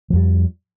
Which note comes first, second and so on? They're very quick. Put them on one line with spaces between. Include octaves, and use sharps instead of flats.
F3 F2 G3